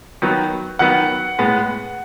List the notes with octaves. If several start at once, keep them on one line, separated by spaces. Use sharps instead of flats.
D#3 F#3 B3
D#3 F#3 B3 F#5
A2 G#3 B3